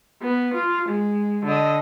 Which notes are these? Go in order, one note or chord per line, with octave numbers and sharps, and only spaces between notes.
B3
F4
G#3
D3 D#5